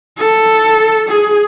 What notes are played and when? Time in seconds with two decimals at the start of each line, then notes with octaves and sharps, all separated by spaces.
0.18 A4
1.09 G#4